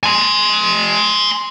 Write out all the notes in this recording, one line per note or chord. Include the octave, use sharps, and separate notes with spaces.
G#5 C6